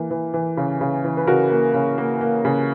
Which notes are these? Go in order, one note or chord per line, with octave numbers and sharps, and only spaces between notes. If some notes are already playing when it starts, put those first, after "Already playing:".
Already playing: E3 A#3
E3
E3
C#3
C#3
E3
B4
C#3 F#4 A#4
A#3
C#3
A#3
A#3
C#3